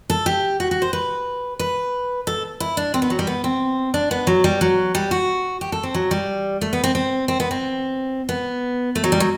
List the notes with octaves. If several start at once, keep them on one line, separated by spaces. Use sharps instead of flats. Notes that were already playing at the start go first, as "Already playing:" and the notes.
A4
G4
F#4
F#4
C5
B4
B4
A4
E4
D4
C4
B3
F#3
G3
B3
C4
D4
B3
F#3
G3
F#3
G3
F#4
G4
A4
C4
F#3
G3
A3
B3
C4
C4
C4
B3
C4
B3
A3
F#3
G3
F#3